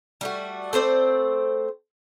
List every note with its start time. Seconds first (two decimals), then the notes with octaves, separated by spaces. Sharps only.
0.21 G3 A3 F#4
0.73 A3 C4 C5 D5